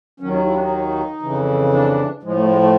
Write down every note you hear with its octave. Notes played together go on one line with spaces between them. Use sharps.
D#2 D#3 F#3 C#4
D#4
E4
D4
D#4
F2 C#3 E3
D4
A2 F3 G#3
A3
G#3
A3